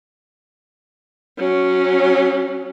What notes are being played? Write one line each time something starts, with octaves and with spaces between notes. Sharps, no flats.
F#3 C#4